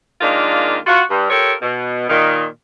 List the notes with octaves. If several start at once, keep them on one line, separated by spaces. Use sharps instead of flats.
D#3 G#3 A#3 D4 F4
F4 F#4
G2
F4 G4 A4 A#4 C#5
B2
A#2 D#3